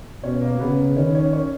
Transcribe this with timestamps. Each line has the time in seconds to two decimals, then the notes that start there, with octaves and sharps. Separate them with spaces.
0.23 B2 C#4 C#5
0.41 A#3 A#4
0.60 C#3 B3 B4
0.96 D#3 C#4 C#5
1.15 C#4 C#5
1.33 C#4 C#5